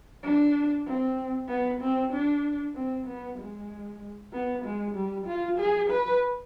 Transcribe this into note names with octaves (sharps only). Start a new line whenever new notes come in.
D4
C4
B3
C4
D4
C4
B3
G#3
B3
G#3
G3
F4
G#4
B4